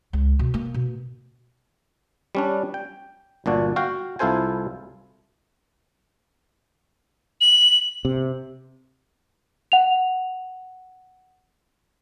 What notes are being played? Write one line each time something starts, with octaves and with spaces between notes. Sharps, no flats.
C#2
B2
A#3
B2
G3 C#4 D4
G5
G1 A#2 D4 F#4
F#4 F5 G5
C2 E4 F4 A4 C5 G#5
F#7
C3
F#5 F7